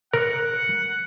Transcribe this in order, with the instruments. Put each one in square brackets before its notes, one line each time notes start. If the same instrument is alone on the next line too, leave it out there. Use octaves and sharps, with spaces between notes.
[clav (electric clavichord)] A#4 [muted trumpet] F#5